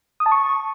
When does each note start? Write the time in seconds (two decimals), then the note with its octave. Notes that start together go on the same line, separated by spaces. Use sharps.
0.20 D#6
0.26 A5
0.32 C#6